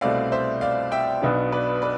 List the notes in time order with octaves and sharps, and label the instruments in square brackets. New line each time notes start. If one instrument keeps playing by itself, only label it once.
[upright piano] C2 B2 A3 C4 [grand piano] D5 F5
[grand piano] C5 E5
D5 F5
E5 G5
[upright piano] B1 B2 B3 D4
[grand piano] B4 D5
B4 D5